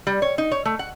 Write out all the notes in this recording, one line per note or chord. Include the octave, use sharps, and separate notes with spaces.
G3
C#5
D#4
C#5
A3
F#5